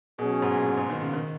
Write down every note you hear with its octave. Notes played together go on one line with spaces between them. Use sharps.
B2 F#3 C#4 G#4
G#2
A#2
G#2
G#2
D#3
C#3
D#3